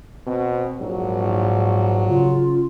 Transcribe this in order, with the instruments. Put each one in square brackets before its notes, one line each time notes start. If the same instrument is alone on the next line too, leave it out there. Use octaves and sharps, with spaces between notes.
[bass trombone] B2 [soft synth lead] C4
[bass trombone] A#1 [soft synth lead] G#2 [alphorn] F#3
[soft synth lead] C#3 [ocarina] F4